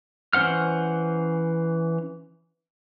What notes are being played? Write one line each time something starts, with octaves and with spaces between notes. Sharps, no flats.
E3 C#4 C5 F#5 F6